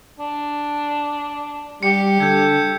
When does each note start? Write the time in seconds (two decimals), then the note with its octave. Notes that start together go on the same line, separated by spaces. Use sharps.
0.20 D4
1.83 G3 G4 C#7
2.20 D3 A4 G6 G#6